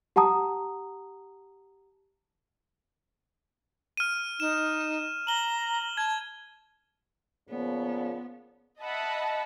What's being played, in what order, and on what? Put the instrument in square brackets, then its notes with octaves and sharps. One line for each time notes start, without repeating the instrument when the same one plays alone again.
[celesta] G4 F#5 A5 A#5 D#6
[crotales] F6 D#7
[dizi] D#4 [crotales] E7
[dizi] A#5 [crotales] F#7 G7
[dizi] A5 [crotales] G#6
[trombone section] A#2 C#3 F3 [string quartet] B3
[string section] D#5 E5 F#5 A5 B5